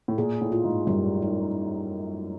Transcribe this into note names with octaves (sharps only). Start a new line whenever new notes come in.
A2
A#2 G#4
A2
F4
G#2
F#2 G3
D#4